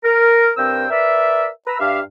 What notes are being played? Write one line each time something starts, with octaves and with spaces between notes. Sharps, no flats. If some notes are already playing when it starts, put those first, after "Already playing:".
A#4
G2 C4 A#4 C5 G5 E6
A#4 B4 D5 E5
B4 A#5 E6
G2 D4 G4 E5 F5